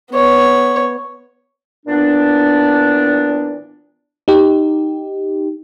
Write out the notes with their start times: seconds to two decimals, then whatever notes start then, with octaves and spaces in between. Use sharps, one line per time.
0.12 B3 C#5
1.86 A#2 E3 B3 D4
4.28 D#4 G4